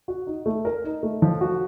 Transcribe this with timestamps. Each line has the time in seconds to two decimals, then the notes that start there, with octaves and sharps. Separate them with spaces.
0.08 F#4
0.27 D#4
0.46 A3
0.65 A#4
0.84 D#4
1.03 A3
1.22 F3
1.41 F#4